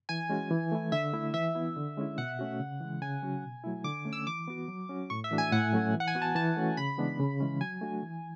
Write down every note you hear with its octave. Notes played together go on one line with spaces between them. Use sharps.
E3 G#5
G#3 C#4 F#4
E3
A3 E4
D3 E5
A3 E4
E3 E5
B3 E4
D3
G#3 C#4 E4
B2 F#5
A3 C#4 F#4
C#3
E3 G#3
C#3 G#5
F#3 C#4 F#4
B2
F#3 A3 E4
D3 D6
A3 C#4
E6
E3 D6
B3 F#4
F#3
C#4 F#4
A2 C#6
E5
E3 A3 D4 F#4
G#5
A2 F#5
F#3 A3 C#4 F#4
E3
F#5
G#5
B3 F#4
A5
E3 A5
A3 C#4 F#4
C#3 B5
E3 G#3 B3 D4
C#3
E3 G#3 C#4
F#3 G#5
A3 D4 F#4
E3